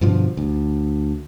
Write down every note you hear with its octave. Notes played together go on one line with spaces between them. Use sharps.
G2 B2 D3 F3
D2